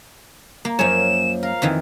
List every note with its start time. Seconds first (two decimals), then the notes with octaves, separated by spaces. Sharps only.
0.65 A#3
0.79 F#2 F3 A#3 C#5 G#5 E7
1.43 A#4 F5
1.62 F2 D#3 E3